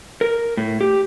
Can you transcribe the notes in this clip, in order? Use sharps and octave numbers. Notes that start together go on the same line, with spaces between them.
A#4
A2
G4